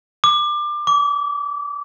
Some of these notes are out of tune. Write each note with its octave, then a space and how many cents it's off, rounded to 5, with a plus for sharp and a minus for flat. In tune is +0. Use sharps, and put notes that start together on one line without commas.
D6 +25
D6 -30